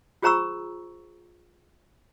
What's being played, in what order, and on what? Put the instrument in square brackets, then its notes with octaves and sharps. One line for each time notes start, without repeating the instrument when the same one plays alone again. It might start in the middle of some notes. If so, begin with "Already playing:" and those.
[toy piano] F4 G#4 C5 A#5 C#6 E6